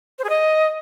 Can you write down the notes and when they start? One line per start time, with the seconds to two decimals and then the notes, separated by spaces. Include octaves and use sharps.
0.19 C5
0.24 G#4
0.29 D#5